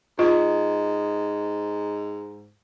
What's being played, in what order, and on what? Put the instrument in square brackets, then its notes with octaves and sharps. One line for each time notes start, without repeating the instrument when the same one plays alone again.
[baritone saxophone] G#2 [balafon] F4 [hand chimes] D#5